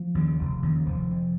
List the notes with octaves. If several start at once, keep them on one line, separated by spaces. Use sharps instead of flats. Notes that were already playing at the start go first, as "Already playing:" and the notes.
Already playing: F3
D#2 C#3
F1
D#2 C#3
F1 F3
F2 C3